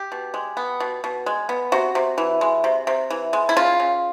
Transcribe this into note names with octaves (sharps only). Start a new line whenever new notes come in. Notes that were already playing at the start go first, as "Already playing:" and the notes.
Already playing: G4
B2
G#3
B3
B2
B2
G#3
B3
C3 F#4
C3
E3
G#3
C3
C3
E3
G#3
E4
C#3 F4
C#3